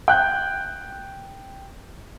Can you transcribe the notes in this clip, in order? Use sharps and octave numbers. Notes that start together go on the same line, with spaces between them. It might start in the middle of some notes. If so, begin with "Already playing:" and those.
G5 F#6 G6